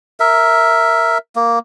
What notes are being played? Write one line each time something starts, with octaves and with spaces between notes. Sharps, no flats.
A#4 E5
A#3